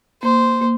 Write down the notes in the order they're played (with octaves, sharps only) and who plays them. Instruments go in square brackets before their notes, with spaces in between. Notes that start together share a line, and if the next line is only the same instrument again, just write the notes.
[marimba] A#3 [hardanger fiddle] C5
[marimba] A#3